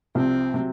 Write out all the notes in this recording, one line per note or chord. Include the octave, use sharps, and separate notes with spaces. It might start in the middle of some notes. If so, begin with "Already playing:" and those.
C2 C3 F3 C4
C3 F#3